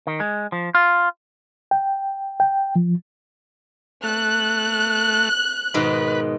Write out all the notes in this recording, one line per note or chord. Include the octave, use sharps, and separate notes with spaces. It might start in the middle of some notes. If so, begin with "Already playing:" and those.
D#3
G#3
F3
F4
G5
G5
F3
A3 F#6
G#2 B2 D#3 B4